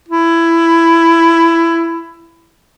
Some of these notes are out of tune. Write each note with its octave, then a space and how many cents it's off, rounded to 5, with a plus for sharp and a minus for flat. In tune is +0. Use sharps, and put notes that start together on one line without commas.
E4 +15